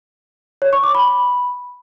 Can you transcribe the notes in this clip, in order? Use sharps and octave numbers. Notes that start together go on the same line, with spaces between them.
C#5
C#6
D6
B5